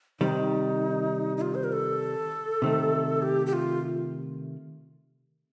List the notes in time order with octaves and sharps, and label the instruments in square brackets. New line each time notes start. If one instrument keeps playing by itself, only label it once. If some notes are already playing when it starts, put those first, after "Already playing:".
[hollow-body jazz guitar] C3 D#3 G3 [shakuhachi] D#4
[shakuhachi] D#4
F4
C5
A#4
A4
[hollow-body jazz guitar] C3 D#3 A3
[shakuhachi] G4
G4
F4